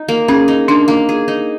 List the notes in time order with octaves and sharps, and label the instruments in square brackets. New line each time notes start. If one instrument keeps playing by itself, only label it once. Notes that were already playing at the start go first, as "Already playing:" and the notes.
Already playing: [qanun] D#4
A#3
[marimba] C#4 [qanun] G#4
[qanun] D#4
[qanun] A#3 [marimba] D4
[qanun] A#3
G#4
D#4